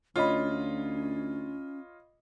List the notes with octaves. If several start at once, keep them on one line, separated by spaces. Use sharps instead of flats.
D2 C#4 F4 C#5 D#5 B5